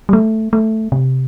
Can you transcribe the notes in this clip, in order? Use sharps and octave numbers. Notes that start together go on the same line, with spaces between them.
G3
A3
A3
C3